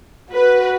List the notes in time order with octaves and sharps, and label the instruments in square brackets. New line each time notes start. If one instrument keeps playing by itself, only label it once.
[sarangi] F#4 [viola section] B4